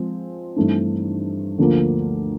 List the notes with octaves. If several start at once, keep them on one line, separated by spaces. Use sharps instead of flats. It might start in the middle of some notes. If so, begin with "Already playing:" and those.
Already playing: F3 G#3 C4
G2 E3 A3 C4 D#4
D2 D3 F3 A#3